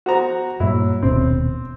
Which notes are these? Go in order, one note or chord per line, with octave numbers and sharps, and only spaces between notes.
F#4 C5 A#5
G2 A#2 F#3 E4
D#1 G#1 B2 C4